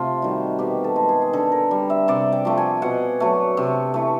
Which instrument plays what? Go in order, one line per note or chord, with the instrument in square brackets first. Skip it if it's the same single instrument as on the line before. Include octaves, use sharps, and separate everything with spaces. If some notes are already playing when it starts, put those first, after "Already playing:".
Already playing: [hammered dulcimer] C3 A3 F4
D#3 G3 F#4
B2 G4
A4
G#3
G#4
G#4
D3 A4
A#4
G3
E5
C3 D5
G5
F3 A3
G#5
B2 F#5
F#3 A3
C3
E3 A3